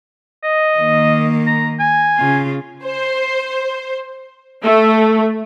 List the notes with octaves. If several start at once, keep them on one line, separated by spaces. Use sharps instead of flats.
D#5
D#3 A#3
A#5
G#5
C#3 F4
C5
A3